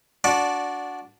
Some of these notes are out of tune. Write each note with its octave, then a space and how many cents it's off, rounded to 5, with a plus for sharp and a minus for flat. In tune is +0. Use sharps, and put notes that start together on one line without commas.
D4 -15 F#4 -10 D5 +0